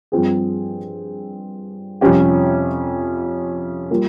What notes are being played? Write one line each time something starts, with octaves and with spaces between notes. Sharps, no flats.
G2 F3 C4 F4 G#4
F2 C3 G3 C#4 G4
G3 A#3 F4